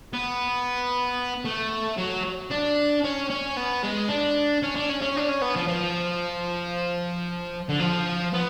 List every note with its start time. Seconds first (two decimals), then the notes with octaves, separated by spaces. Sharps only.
0.13 B3
1.45 A3
1.98 F#3
2.50 D4
3.04 C#4
3.30 C#4
3.57 B3
3.84 G#3
4.09 D4
4.63 C#4
4.76 D4
4.89 C#4
5.02 C#4
5.16 D4
5.29 C#4
5.42 B3
5.56 F3
5.68 F3
7.69 D3
7.80 F3
8.34 B3